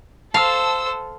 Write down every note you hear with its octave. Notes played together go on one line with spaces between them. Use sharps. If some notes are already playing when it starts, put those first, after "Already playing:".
A4 C5 F5 A5 E6